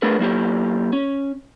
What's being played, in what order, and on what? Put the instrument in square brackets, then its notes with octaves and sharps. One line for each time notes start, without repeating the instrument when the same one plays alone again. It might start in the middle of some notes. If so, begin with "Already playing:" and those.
[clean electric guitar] A3 D4 G#4 A#4 B4
F#3 A#3 E4 G4
C#4